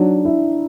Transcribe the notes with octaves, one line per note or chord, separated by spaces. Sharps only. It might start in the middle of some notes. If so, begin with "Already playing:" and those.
Already playing: F#3 D4 D#4
E4